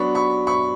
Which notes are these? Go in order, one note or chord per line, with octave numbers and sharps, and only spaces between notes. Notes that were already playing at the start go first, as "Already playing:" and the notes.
Already playing: F#3 B3 D4 B5 C#6
B5 C#6
B5 C#6